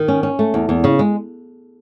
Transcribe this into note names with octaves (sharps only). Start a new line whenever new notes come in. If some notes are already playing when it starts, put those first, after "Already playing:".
Already playing: D#3
C#4
C#4
A3
E2
E2
C#3
G#3